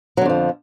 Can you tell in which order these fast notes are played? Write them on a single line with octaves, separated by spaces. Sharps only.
F#3 D3 F2 F3